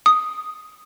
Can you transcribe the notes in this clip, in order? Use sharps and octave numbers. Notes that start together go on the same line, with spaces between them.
D#6